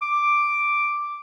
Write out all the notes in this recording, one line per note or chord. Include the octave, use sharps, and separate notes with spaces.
D6